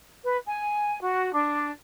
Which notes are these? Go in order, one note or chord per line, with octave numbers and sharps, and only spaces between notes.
B4
G#5
F#4
D4